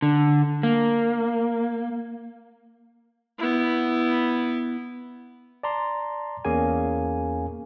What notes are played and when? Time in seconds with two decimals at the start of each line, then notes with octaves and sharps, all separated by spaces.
0.02 D3
0.63 A#3
3.39 B3 E4
5.63 D5 A5 A#5 C6
6.45 E2 A#3 C#4 G#4 F5 G#5